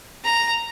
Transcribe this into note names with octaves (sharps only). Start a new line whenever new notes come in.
A#5